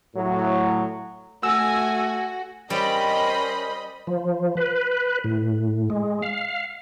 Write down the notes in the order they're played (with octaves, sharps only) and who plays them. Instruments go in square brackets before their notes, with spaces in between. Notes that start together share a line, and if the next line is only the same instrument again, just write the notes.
[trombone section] A2 F#3
[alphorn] A3 [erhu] F#4 [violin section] G#5 [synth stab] E6
[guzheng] G3 [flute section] C#4 A#4 C5 [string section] D#5 B5
[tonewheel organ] F3
B4
A2
G#3
F5